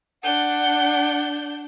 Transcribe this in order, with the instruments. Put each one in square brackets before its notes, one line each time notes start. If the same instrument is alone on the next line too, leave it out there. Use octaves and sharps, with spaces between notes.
[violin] D4 G6 [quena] F#5